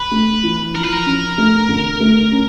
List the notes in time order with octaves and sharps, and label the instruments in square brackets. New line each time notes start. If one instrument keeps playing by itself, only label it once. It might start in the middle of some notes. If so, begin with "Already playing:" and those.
Already playing: [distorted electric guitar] B4
[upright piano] A3
E3
[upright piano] F3 [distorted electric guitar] A#4
[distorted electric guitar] B4
A#4
[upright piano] C#4
A3
D3
A3
C#4